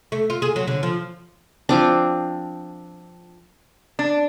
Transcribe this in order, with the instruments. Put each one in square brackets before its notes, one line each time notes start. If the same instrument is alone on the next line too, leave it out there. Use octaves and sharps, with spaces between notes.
[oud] A3
F4
G#4
F#3
D3
F3
[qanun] F3 C4 D4
[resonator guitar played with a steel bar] D4